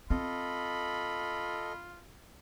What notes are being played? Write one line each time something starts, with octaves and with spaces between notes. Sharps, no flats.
C4 F4 A4 D#5 B5